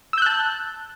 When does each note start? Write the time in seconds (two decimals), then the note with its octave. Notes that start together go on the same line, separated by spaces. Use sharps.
0.13 E6
0.18 G6
0.22 F#6
0.26 A5